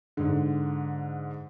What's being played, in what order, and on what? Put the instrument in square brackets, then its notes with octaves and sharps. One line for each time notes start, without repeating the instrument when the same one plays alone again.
[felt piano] G#2 D3